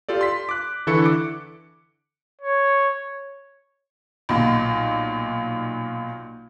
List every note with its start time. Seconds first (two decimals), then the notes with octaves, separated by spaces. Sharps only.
0.09 F4 G4 A4 D5
0.21 C6 B6
0.49 D6 F#6
0.87 D3 E3 E4 A4 C#6 C#7
1.05 D6
2.41 C#5
4.29 B1 A#2